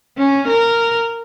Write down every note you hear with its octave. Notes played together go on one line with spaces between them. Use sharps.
C#4
A#4